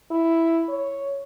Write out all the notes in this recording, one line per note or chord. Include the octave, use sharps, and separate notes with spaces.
E4
C#5